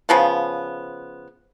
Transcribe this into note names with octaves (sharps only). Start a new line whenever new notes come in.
C#3 F3 B3